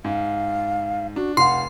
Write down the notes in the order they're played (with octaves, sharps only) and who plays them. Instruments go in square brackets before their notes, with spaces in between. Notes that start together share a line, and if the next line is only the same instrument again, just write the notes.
[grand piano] G#2 [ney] F5
[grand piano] D4 [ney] F#4
[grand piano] F1 F5 [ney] F#5 [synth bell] C6